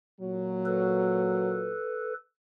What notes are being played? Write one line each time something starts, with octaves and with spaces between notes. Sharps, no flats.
A#2 F#3
A4 B4